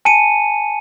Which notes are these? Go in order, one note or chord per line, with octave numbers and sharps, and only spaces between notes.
G#5 A5 C#7 D#7